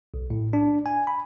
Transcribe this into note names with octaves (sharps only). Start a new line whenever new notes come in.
B1
A2
D4
G#5
B5